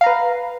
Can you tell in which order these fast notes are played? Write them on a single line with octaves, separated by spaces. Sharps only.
F5 A#5 B4